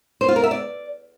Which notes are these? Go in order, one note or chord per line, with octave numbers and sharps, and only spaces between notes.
C5
F4
A#4
E5
D5